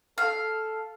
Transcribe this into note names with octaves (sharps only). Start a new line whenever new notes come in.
A4 F5